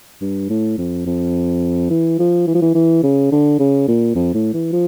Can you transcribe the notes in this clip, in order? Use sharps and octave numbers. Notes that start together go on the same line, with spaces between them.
G2
A2
F2
F2
E3
F3
E3
F3
E3
E3
C#3
D3
C#3
A#2
F2
A2
E3
F3